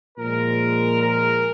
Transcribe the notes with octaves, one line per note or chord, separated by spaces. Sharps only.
A#2 F3 G#3 A#4
A#4